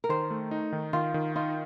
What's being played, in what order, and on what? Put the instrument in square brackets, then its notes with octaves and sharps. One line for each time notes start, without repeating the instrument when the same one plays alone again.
[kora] A#4
[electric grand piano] D#3 [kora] C5
[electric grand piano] A3
D#4
D#3
[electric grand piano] D#3 [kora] F4
[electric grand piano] D#3
[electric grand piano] D#4 [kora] F4